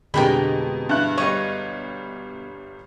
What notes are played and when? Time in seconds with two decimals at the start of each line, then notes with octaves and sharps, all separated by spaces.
0.14 F2 B2 D3 G#3 G4 A#4 G5 B5
0.89 G2 E4 F#6
1.18 G1 G3 C#5 D#5 C#6